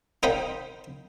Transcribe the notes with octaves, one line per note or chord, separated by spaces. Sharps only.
D#4 A#4 C5 F5 G5 B5